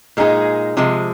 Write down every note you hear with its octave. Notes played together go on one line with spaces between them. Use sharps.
A#2 G#3 D#4 G#4
C3 F3 G#3